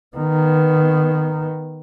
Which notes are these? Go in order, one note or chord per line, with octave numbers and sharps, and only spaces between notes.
D#3 B3